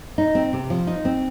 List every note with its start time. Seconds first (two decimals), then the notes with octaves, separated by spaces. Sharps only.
0.18 D#4
0.35 C4
0.53 C3
0.70 F3
0.87 D#4
1.05 C4